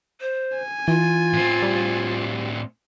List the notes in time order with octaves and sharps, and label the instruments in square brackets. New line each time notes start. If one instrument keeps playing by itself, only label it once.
[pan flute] C5
[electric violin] G#5
[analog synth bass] E3 [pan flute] F4
[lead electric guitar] A2 C4
[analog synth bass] G3